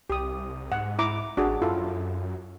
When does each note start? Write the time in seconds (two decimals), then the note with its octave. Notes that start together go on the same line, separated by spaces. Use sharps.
0.10 C2 G4 D#6
0.72 G#2 F#5
0.99 E4 A#5 D6
1.37 G#1 D4 F#4 G#4
1.62 F#2 E4 F4 A4